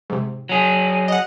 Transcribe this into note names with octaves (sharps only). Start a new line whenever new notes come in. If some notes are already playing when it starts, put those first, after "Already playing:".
G#2 C3
F#3 G#4
D#5 F#5